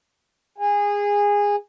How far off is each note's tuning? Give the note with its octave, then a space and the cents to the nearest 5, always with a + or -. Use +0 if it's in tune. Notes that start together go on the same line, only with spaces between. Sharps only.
G#4 -20